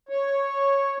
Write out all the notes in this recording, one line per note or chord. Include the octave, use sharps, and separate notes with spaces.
C#5